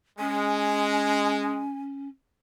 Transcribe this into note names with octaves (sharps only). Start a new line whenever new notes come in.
G#3 C#4 G#5